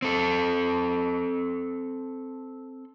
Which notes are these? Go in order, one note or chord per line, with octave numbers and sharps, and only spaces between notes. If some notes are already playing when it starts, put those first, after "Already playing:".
C4 A4